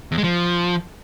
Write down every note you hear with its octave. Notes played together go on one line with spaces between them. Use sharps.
E2
G#3
F3